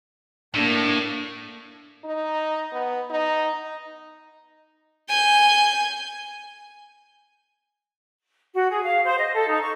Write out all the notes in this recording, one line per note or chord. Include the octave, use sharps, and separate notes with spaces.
A2 A#3 D4
D#4
B3
D#4
G#5 G6
F#4
G#4
F5
C5
D#5
A4
D#4
C#6